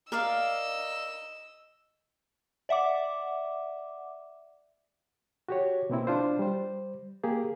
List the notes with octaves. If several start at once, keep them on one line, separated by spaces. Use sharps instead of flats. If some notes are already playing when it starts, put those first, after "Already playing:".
A#4 D5 D#5 F5 E6
D5 E5 F#5 D6
F#4 G4 C#5
B2 A#3 C4 E4
D4 F4 C5
G3 C5
A#3 G4 G#4